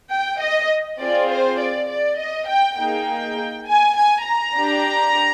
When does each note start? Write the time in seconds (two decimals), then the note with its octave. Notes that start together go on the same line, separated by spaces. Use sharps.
0.11 G5
0.41 D#5
1.00 C4 F4 G#4 D5
1.30 C5
1.59 D5
1.89 D5
2.18 D#5
2.48 G5
2.77 A#3 D#4 G#4 G5
3.67 G#5
3.97 G#5
4.27 A#5
4.56 D4 G4